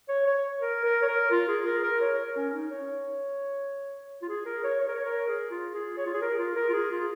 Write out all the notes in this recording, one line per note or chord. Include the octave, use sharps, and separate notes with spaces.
C#5
C#5
A#4
A#4
C#5
A#4
F4
G#4
A#4
A#4
C#5
A#4
C#4
D#4
C#5
F4
G#4
A#4
C#5
C#5
A#4
C#5
A#4
G#4
F4
G#4
C#5
F4
G#4
A#4
G#4
F4
A#4
F4
G#4
F4